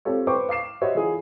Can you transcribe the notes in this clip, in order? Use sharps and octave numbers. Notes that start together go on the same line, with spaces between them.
C4 F4 G4 A4 C#5
B4 C5 G5 C#6 D6
F5 D6 C7 E7
F#4 G4 C5 C#5 D#5 E5
E3 E4 F4 G#4